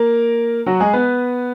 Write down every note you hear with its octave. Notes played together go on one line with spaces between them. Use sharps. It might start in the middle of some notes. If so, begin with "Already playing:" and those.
Already playing: A#3 A#4
F#3 F#4
G#3 G#4
B3 B4